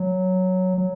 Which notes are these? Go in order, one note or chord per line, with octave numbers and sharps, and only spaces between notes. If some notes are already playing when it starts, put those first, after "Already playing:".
Already playing: F#3
F#3